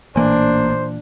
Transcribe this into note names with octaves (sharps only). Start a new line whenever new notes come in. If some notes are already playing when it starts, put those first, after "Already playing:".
A1 A#2 E3 A#3 D4 C5 G#5